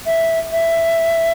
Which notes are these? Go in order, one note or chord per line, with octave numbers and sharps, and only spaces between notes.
E5
E5